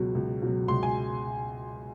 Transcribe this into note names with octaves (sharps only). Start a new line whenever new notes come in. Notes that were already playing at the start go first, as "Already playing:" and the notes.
Already playing: C#2 B2 F#3
C#2
B2 F#3
C#2 C6
G#5